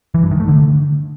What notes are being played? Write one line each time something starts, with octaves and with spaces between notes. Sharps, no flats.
E3
G2
D#3
A3
D3